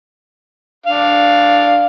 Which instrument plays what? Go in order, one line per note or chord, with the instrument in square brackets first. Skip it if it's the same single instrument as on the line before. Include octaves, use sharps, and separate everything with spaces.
[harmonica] D4 F5